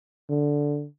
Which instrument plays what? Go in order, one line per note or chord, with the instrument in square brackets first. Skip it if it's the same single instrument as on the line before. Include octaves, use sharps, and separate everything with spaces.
[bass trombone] D3